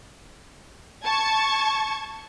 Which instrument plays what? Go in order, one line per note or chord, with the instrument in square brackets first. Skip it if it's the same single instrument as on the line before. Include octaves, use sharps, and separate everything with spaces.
[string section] A5 C#6 G#6